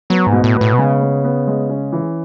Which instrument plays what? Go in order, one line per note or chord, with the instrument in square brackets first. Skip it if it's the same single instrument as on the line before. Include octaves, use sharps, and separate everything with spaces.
[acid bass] F#3 [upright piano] B3
[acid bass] G#2
[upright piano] B2
[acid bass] A2
[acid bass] A2 [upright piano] B3
[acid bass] B2
[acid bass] C#3 [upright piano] G#3
[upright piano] B3
B3
G#3
C#4
E3